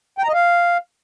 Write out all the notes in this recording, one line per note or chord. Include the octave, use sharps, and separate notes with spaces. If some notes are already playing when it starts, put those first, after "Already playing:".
G5
A#5
D#5
F5